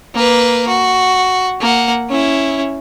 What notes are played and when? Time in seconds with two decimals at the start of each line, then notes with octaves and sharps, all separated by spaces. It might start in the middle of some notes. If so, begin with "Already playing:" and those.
0.15 A#3 B4
0.68 F#4
1.61 A#3 F#5
2.09 C#4 E4